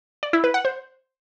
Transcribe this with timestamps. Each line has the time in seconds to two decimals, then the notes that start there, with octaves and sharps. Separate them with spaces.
0.23 D5
0.33 E4
0.44 B4
0.54 F#5
0.65 C5